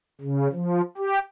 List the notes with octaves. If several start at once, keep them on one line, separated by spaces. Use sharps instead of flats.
C#3
F3
G4